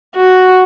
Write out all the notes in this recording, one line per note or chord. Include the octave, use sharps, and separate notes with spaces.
F#4